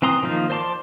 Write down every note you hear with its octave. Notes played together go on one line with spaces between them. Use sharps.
E3 C4 A#5 C6 D#6
D#3 F3 A#3 D#4 F4
C5 D5 A5 C6 D6